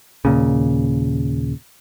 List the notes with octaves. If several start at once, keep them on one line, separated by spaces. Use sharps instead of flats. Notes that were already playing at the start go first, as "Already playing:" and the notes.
D#2 A#2 C#3